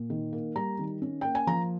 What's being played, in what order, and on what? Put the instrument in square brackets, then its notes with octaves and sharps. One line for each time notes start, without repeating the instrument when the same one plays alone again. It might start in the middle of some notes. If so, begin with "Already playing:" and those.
Already playing: [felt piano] A#2
D#3
A#3
G3 A#5
D#3
C#4
A#3 G5
G#5
F3 A#5